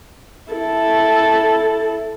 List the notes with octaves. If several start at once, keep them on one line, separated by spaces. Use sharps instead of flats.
E4 A4